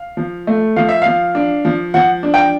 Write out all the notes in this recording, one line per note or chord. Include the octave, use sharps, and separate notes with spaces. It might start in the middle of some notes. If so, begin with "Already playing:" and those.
Already playing: F5
F3
A3
F3 F5
E5
F3 F5
D4
F3
F3 F#5
D4
G5